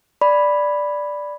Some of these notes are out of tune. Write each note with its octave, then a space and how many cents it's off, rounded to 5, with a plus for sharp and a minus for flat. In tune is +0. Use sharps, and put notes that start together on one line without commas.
D5 +0 B5 +0